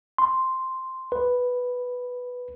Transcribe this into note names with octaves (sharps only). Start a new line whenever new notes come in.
C6
B4